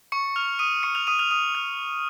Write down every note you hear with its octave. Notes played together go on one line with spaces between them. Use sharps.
C#6 C#7
F6 F7
D#6 D#7
C#6 C#7
F6 F7
D#6 D#7
F6 F7
D#6 D#7
F6 F7